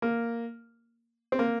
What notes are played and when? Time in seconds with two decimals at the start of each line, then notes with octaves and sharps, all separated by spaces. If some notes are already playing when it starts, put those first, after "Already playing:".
0.02 A#3
1.32 C4
1.39 A#3